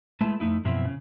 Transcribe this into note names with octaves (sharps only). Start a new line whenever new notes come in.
G#3 A3 E4 B4 A5
F2 A3 D#4 E4
F#2 B2 F3 C4 E4
C#3